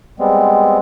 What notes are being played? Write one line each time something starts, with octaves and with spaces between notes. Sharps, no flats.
G3 G#3 B3 C4